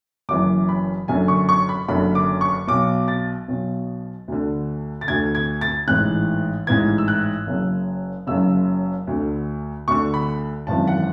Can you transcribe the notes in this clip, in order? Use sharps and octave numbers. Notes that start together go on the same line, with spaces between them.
F#1 F#2 E3 D6
B5
F#1 F#2 D3 G#5
C#6
C#6
B5
F#1 F#2 D3 B5
D6
C#6
B1 B2 D6
A6
B1 B2
D2 D3
A6
D2 D3 G#6
G#6
A6
A1 G#2 E3 F#6
A1 G#2 E3 G#6
E6
F#6
F#1 F#2 C#3
F#1 F#2 C#3 E6
D2 D3
D2 D3 C#6
B5
G#1 F#2 E3 A5
F#5